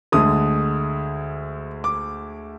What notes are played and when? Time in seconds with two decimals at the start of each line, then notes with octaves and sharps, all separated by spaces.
0.12 D2 D3 G#3 D#6
1.84 D6